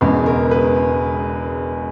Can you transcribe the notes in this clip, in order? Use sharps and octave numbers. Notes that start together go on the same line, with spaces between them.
E1 E2 C#3 G#3 B3
A#4
B4